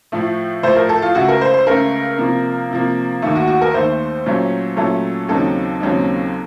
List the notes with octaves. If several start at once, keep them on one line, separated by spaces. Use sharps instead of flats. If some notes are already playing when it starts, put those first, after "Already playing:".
A2 F3 A3
A2 F3 A3 C5
A#4
A4
F4
C#2 C#3 A3 F#4
A#4
C5
C5
C#2 C#3 A3 A#4
C3 F3 A#3
C3 F3 A#3
D#2 D#3 A3
F#4
F#4
A#4
D#2 D#3 A3 C5
A#2 F#3 A3 C#4
A#2 F#3 A3 C#4 A4
D#2 C#3 F#3 C4 D#4 A4
D#2 C#3 F#3 C4 D#4